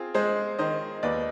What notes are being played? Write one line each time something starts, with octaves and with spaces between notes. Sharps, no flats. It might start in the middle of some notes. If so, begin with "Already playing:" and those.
Already playing: C4 F4 G#4
G#3 G#4 C5
D#3 C5 D#5
D#2 B4 D5